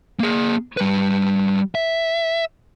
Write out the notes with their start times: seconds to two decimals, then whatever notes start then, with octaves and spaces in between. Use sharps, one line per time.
0.20 A#3 G#4
0.77 G3 B4
1.75 E5